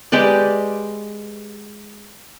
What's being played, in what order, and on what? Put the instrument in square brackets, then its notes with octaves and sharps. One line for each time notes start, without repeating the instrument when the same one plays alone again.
[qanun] G#3 G4 B4 D5